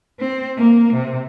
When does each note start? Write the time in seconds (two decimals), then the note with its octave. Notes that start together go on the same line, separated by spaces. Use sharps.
0.20 C4
0.58 A#3
0.93 C3